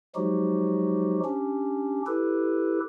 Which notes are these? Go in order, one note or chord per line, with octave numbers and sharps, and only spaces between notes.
F3 F#3 G#3 D#4 F#4 G4
C#4 D4 G4
E4 G4 A4 B4